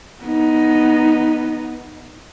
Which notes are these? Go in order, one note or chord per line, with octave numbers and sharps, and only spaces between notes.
B3 D#4